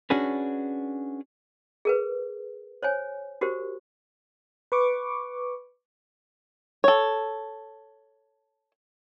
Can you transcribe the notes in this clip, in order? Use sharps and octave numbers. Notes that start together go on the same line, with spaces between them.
C#4 D4 F#4 G#4 B4
G#4 A#4 B4
C5 C#5 G#5
F#4 G4 A#4 C5
B4 C#6 D6
A4 C#5